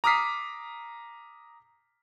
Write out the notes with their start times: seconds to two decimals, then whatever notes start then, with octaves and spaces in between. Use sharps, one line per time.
0.04 A#5 D6 D#6 F6 B6 C7